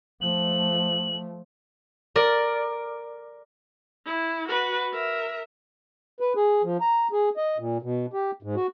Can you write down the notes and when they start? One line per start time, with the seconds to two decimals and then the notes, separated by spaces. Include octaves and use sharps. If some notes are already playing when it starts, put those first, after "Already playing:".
0.21 F3 A3 F#7
2.16 A#4 D5
4.06 E4
4.48 F#4 B4
4.93 A#4 E5
6.20 B4
6.36 G#4
6.64 F3
6.81 A#5
7.12 G#4
7.37 D#5
7.58 A#2
7.82 B2
8.13 G4
8.42 G#2
8.56 F#4